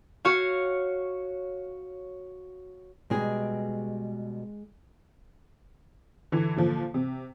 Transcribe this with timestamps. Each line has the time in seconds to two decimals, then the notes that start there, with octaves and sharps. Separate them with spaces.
0.25 F#4 C#5 F5
3.10 B2 G3 G#3 G#4
6.32 D3 E3
6.56 A#2 D3 F3
6.94 C3